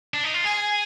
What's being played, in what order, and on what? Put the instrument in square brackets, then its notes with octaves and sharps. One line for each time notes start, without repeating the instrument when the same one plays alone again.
[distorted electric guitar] D4
D#4
F4
[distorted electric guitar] G#4 [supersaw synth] G#5